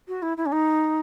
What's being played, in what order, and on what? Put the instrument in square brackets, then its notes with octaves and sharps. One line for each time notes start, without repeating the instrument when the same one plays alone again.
[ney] F#4
E4
E4
C#4
D#4